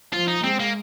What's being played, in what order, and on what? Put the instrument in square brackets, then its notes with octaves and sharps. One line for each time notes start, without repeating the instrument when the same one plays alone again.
[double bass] F3 [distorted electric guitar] F4
[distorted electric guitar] D#4
[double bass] G#3 [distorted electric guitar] C4
[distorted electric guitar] A#3